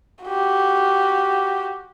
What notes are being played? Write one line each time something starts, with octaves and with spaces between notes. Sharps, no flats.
F#4 G4